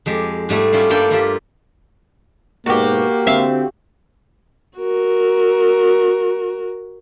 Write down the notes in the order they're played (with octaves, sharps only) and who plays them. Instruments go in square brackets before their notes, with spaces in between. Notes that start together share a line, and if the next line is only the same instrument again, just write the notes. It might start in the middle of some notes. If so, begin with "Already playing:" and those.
[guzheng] F2 G#3 G4
G#2 G3 A3 G#4
G3 C#4 E4 F4
G2 G3 A#3 A4 D5 G5
A#3 F4 G4 E5
[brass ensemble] G#2 B2 [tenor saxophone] A#3 [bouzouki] F#4 G4
[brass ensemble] D3 C4 [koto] E5 F5
[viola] F#4 A#4